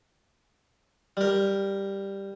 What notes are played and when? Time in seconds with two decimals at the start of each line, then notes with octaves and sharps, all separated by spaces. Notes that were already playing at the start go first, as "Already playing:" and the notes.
1.17 G3 A#4